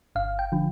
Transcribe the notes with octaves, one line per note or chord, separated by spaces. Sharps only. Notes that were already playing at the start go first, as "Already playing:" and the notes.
G1 F5
G5
D3 F3